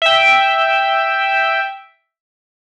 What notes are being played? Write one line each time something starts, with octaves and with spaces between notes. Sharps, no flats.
E5 G5